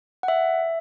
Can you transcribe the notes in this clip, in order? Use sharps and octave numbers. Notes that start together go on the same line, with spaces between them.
F#5
E5